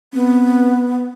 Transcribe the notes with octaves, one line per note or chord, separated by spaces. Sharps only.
B3 C4